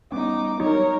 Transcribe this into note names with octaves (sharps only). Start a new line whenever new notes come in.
G3 B3 C#4 D#4 D6
F#3 G3 D#4 A#4 C#5